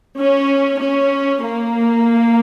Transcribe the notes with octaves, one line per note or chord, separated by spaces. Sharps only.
C#4
C#4
A#3